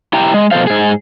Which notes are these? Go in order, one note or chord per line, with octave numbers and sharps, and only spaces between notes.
E4 G4 G5 A#5
G#3
B2 F3 A4 C5 F5
G#2 G#4